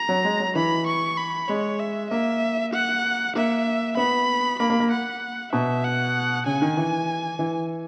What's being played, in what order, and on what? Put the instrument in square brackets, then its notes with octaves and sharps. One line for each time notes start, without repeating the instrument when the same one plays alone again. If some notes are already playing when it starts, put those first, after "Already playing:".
Already playing: [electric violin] A#5
[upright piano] F#3
G#3
F#3
[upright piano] E3 [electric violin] B5
[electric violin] C#6
B5
[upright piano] G#3 [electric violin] C#5
[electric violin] E5
[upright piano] A#3 [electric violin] E5
[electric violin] F#5
[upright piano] A#3 [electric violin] E5
[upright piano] B3 [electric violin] B5
[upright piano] A#3 [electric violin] B5
[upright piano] A#3
A#3
[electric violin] F#5
[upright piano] B2 [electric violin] E5
[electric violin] F#5
[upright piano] C#3 [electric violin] G#5
[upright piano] D#3
E3
E3